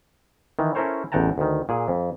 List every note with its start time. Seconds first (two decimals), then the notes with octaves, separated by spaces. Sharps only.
0.59 D#3 E3
0.75 C#4 E4 A4 A#4 C5 C#5
1.12 A1 E2 F#5 G5 A5 A#5
1.38 D2 D#3
1.69 A#2 G#4
1.88 F2